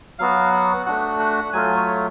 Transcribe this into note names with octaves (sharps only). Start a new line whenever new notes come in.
F#3 B3 F#4 F5
F#5
A3 D4 F#4 F#5
F#5
F#3 A3 F4 G#5
C#5